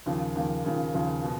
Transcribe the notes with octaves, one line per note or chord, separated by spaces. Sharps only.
D#2 C#3 F3
D#2 C#3 F3
D#2 C#3 F3
D#2 C#3 F3
B2